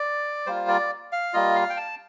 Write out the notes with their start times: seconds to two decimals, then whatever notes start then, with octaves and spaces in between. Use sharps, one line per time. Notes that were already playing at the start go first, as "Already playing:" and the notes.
Already playing: D5
0.46 G3 A#3 F4 C5
0.68 D5
1.12 F5
1.34 G3 A#3 F4 D#5
1.56 F5
1.70 G5
1.77 A5